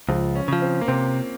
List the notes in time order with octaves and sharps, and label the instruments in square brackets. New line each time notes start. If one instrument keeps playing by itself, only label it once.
[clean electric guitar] C#2 [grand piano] F3
[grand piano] C#4
[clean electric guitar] C#3 F3
[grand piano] C4
A#3
[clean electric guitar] C3 [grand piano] C4